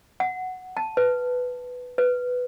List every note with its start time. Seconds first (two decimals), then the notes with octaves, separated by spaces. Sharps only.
0.20 F#5
0.77 A5
0.97 B4
1.98 B4